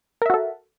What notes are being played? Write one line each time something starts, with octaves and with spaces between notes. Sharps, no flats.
F#4 A4 A#4 E5